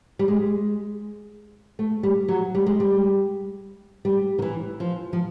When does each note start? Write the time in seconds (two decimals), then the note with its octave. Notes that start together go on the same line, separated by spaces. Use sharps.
0.19 G3
0.28 G#3
1.79 A3
2.03 G3
2.28 F#3
2.55 G3
2.66 G#3
2.80 G3
4.05 G3
4.38 D#3
4.42 E3
4.80 F3
5.13 F3